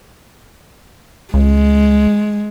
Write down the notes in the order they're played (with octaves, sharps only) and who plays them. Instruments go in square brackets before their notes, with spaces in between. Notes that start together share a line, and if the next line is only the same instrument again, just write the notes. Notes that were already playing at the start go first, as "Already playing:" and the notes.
[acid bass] C#2 [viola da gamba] G#3